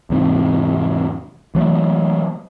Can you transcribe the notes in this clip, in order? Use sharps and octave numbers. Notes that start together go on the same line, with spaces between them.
E2 G#2 C3
E3 F#3 A3